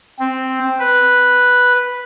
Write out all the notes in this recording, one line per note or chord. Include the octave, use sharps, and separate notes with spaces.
C4
B4